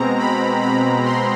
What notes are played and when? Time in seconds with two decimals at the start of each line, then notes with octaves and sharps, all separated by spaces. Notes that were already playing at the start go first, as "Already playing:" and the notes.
Already playing: B2 G#3 C4 A#5
0.19 B5
0.62 B5
1.05 C6